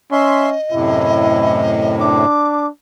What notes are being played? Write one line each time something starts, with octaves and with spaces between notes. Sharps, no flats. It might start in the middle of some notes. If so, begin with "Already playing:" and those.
C#4 D#5 E5 C6
F#2 A2 C3 E4
D4 D6